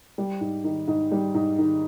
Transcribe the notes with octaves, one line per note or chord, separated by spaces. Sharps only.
G3
G#2
D#3
G#2
G3
G#2
D#3